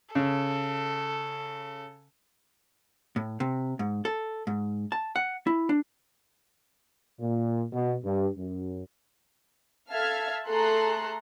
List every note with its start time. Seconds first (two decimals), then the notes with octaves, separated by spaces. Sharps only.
0.15 C#3 A4
3.16 A2
3.40 C3
3.79 G#2
4.05 A4
4.47 G#2
4.92 A5
5.16 F#5
5.47 E4
5.69 D4
7.20 A#2
7.73 B2
8.04 G2
8.36 F#2
9.90 A4 E5 F5 A5 F6 G#6
10.48 A3 G#4 A4 A#5 C6 F#6